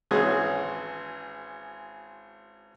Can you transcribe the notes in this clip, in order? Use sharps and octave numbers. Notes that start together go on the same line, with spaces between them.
G#1 E3 G#3 C#4 F#4 G#4